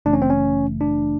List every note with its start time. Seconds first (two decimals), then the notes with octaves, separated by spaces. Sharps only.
0.05 G1 F#2 C#3 E3 A3 D4
0.13 C#4
0.22 C4
0.30 C#4
0.81 D4